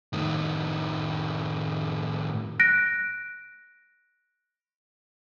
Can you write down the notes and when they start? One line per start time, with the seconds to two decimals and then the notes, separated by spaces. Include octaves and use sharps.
0.13 A2 D#3
2.60 F#6 A#6 D7